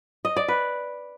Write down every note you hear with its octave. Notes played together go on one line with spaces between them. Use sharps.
D#5
D5
B4